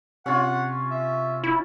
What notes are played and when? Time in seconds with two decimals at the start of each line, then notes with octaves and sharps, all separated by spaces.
0.26 C3 C#4 F4 F#5
0.91 E5
1.43 E4